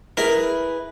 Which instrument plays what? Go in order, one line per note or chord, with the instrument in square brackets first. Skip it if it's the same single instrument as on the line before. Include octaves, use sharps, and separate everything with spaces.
[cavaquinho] E4 G#4 B4 [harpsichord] A#4